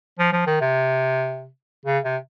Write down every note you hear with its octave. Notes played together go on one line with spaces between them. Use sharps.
F3
F3
D#3
C3
C#3
C3